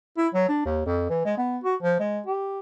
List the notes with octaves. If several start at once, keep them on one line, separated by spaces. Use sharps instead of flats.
E4
F#3
D4
D#2
F2
E3
G#3
B3
F#4
F3
G#3
G4